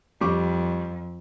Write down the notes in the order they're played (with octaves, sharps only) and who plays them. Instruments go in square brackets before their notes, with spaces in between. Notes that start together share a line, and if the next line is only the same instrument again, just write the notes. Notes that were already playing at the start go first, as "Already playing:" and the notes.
[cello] F2 [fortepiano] G3 C#6 D6